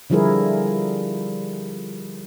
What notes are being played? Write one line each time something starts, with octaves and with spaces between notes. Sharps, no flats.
D3 F3 G3 E4 G#4 A#4